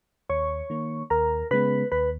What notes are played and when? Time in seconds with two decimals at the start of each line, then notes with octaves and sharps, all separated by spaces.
0.29 D#2 C#5 C#6
0.70 D#3 A#3
1.10 D#2 A#4 A#5
1.51 C#3 G#3 B3 B4 B5
1.92 D#2 B4 B5